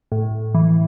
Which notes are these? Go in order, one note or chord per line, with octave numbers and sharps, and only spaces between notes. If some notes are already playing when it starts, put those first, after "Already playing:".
A2
E3